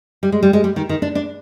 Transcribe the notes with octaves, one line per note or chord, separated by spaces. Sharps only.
G3
G#3
G3
G#3
G3
D#3
D#3
D4
D4